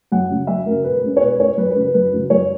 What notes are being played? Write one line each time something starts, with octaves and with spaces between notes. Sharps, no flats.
F#2 F#5
C#3 F#3
F#2 E5
C#3 F#3 A#4
B2 B4
G#3 C#4
C#5
B2 B4
G#3 C#4 C#5
F#2 B4
B4
C#3 F#3 C#4
B4
F#2 B4
C#3 F#3 C#4
F#2 C#5